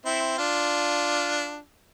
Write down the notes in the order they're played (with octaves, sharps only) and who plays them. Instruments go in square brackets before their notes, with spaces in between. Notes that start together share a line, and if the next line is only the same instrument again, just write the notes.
[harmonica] C4 E4
D4 F4